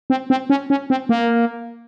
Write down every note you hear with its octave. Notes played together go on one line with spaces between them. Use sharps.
C4
C4
C#4
C#4
C4
A#3